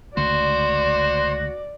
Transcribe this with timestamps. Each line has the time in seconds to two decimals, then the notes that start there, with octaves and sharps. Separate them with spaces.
0.17 C#2 D3 A3 F#4 C5 D5